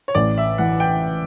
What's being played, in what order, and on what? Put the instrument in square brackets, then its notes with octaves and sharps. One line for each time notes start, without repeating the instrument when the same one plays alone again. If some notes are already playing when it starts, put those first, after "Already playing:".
[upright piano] C#5
[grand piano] A1 [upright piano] D5
[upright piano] E5
[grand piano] E3 [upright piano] F#5
[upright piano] G5